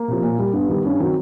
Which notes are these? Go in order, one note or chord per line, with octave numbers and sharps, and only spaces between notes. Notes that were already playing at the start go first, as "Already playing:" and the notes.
Already playing: A#3
C3 F3
A#2
G3
G2 B3
D#3 G3
G2 C#4
D#3 F#3 C4